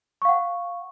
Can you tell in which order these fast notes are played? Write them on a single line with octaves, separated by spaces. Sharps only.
C#6 F5 F#5